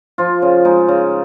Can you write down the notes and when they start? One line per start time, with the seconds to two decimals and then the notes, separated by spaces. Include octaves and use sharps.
0.18 F3 F4
0.42 C#3
0.65 G#3 D#4
0.88 C#3